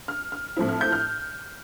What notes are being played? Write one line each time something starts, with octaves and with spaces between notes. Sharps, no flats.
F6
F6
A2 F3 C4 E4
F6
G6
F6